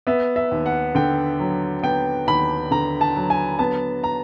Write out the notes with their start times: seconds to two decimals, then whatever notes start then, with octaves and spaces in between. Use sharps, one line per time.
0.07 B3 E5
0.36 E5
0.51 D#2
0.66 F#5
0.95 D3 G5
1.39 F#3
1.83 B3 G5
2.27 D#2 B5
2.71 D3 A#5
3.01 A5
3.16 F#3
3.30 G#5
3.59 B3 A5
4.04 A#5